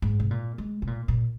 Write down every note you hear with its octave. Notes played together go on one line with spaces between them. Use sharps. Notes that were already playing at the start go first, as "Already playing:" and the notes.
G#2
C3
A#2
G#3
C3
A#2
A#2